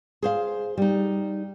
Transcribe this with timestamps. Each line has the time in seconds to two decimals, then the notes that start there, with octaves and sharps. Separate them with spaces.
0.22 G#4 C5 F5
0.78 G3 D#4